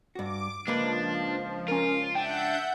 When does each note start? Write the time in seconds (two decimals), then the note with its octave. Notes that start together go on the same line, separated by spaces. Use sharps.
0.15 G2 F#4 D6
0.67 C#2 F3 A#3 D4 B4
1.68 C#4 F4 A#4
2.15 D4 E5 F#5 G5 G6